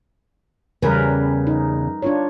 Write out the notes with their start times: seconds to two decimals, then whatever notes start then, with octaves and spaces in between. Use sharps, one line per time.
0.82 E2 C#3 G3 C#4 A#4 B4
1.47 D#4
2.02 D4 F4 C#5